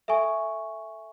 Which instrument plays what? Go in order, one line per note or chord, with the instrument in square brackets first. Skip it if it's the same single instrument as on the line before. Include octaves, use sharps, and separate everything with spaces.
[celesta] A4 E5 G#5 C#6